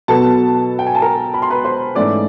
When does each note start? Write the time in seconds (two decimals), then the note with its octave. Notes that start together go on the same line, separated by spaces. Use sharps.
0.08 B2 F#3 B3 A4 A5
0.79 G5
0.87 G#5
0.95 A5
1.02 A#4 A#5
1.34 B5
1.42 C6
1.50 B4 B5
1.64 C5 C6
1.95 G#2 E3 A3 C#4 D5 D6